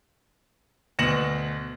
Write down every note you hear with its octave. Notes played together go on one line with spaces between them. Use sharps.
D2 B2 A#6 C#7 E7 F#7